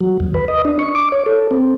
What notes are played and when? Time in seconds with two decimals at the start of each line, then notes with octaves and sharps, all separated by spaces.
0.01 F#3
0.20 D#2
0.34 B4
0.48 D#5
0.65 D4
0.79 C#6
0.95 D6
1.12 C#5
1.26 A4
1.51 C4